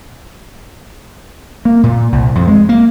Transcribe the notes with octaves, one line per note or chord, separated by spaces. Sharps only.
A#3
A#2
C2
F2
G#3
A#3